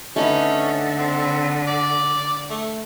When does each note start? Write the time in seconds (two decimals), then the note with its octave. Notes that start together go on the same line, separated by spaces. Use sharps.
0.16 D3 A3 C#4 D#4 B4
0.98 C4
1.67 D5
2.50 A3